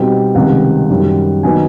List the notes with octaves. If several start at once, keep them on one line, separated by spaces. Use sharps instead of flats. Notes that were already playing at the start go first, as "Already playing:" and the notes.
Already playing: B2 G3 C4 D#4
C#2 C3 D#3 G3 F#5
F#2 D#3 G3
D#3 F#3 B3 D#4 G#5